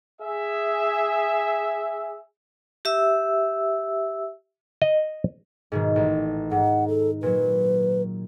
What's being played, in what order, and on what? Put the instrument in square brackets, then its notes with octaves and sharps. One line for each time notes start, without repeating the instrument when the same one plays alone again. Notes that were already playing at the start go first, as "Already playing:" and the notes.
[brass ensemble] G#4 E5
[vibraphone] G4 E5 E6
[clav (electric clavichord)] D#5
[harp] G#2 B2 D#3
A1
[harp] G#2 [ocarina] F#5
[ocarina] A4
[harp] A#2 F#3 [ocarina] B4